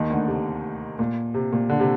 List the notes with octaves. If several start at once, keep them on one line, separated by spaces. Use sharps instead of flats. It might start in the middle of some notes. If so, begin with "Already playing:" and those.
Already playing: D#2 D#3
D2 D3
C3
A#2
C3
A#2
D3
C3